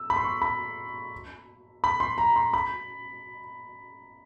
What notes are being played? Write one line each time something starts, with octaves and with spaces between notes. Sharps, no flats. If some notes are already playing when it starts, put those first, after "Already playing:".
Already playing: E6
B5
C6
C#6
B5
B5
C6
A#5
C6
B5